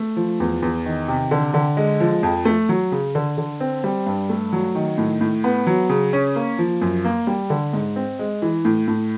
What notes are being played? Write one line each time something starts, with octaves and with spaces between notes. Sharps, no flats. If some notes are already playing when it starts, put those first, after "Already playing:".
Already playing: A3
F3
E2
E2
D#3
C3
D3
D3
G#3
F3
F2
A3
F#3
C#3
D3
D3
C4
G3
G2
A3
F#3
D#3
A2
A2
B3
F#3
C#3
C#4
A#3
F3
F#2
A#3
G3
D3
G#2
C4
G#3
E3
A2
A2